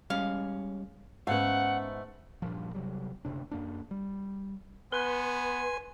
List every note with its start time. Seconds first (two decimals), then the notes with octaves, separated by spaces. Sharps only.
0.10 G3 G#3 C#4 F5
1.27 G#2 A3 B3 C#4 F5 F#5
2.42 G2 A#2 F3
2.74 C3 F#3 G3
3.25 F#1 D2 C3 D4
3.51 F#2 A#3 D4
3.91 G3
4.92 B3 B4 G#5 C6